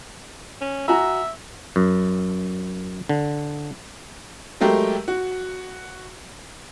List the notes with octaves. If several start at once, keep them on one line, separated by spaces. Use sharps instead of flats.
C#4
F#4 E5 G#5 A#5
F#2
D3
F#3 G#3 A3 G4 A#4
F#4